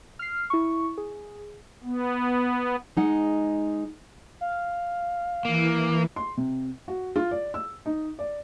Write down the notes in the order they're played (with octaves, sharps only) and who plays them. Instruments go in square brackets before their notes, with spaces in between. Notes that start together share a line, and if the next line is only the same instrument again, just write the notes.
[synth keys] F6 C7
E4 C#6
G#4
[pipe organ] B3
[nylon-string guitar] G#3 D#4 F#5
[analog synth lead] F5
[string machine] E3 [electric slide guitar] A#3
[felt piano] C6
C3
F#4
F4
D5
E6
D#4
D5